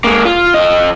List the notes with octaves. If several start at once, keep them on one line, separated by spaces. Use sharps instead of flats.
G#3 A#3
F4
F2 D#5